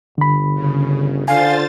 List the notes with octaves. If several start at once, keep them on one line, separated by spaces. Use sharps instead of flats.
G1 D3 B5
C#3
D3 F4 C5 F5 G#5 A6